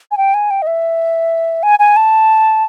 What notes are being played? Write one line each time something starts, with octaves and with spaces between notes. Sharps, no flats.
G#5
G5
G#5
G5
D#5
E5
G#5
G#5
A5